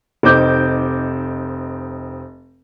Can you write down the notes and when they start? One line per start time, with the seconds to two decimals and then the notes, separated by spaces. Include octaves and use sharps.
0.23 F1 C4 D#4 D6 G6